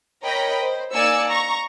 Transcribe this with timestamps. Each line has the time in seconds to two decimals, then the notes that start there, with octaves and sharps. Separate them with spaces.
0.22 A#4 C#5 D#5 G5 B5
0.62 C5
0.94 A#3 D#4 D5 G#5 E6 C#7
1.28 A#5 C#6